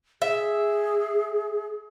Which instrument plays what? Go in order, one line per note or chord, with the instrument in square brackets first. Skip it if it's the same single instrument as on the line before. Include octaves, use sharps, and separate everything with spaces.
[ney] G#4 [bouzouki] E5